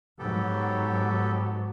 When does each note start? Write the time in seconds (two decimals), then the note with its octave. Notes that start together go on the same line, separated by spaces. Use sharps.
0.19 G#2 F#3 B3 G4 A4